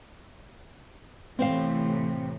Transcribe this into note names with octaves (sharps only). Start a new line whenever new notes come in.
A2 C3 E3 C4 C5 F5